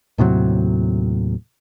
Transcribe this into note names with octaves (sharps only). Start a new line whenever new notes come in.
D#2 A2 C3 F#3